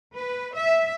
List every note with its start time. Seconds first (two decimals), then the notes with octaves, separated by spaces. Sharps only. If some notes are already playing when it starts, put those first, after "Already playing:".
0.14 B4
0.54 E5